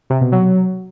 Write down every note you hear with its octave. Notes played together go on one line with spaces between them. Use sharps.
C3
B2
F#3